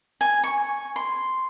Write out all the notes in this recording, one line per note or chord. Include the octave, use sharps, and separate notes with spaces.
G#5
C#6
C6